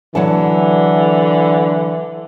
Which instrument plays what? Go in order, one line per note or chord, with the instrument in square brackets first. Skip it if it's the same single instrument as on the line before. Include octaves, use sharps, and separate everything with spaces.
[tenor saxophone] D3 [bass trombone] E3 [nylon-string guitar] F#3 F#5 A5